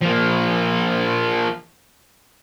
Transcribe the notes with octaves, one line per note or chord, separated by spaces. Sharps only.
F3 A#3